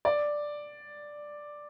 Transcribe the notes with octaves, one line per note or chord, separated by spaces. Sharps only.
D5